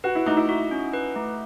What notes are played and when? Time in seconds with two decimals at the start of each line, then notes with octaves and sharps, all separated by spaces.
0.04 F#4 B4
0.15 E4
0.26 A3 D#4
0.37 E4
0.49 F#4
0.71 C#4
0.93 B4
1.16 A3